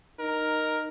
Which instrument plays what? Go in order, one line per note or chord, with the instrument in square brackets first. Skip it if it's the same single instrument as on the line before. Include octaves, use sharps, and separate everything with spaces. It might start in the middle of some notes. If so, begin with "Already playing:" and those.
[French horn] D#4 [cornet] A#4